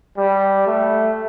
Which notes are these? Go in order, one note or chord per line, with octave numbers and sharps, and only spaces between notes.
G3
A3